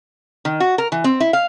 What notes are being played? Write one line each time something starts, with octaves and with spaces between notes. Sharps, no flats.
D#3
F#4
A#4
E3
C4
E4
F5